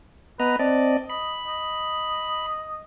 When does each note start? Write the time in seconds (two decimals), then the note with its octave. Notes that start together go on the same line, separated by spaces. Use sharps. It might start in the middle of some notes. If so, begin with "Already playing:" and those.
0.40 B3 B4 D#5 A#5
0.59 C4 D5 D#5 A5
1.10 D#5 B5
1.47 D#5